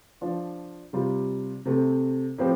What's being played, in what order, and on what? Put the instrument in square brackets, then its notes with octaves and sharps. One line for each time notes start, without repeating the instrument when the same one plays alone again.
[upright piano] F3 D4 F4
C3 G3 F4
C3 A3 C4
A2 F3 C4 G4